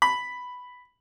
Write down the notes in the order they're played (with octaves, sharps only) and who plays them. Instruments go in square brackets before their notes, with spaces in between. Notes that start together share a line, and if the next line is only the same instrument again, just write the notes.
[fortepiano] B5